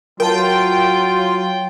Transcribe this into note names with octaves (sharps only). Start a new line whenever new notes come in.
F#3 F4 A#4 G5 A5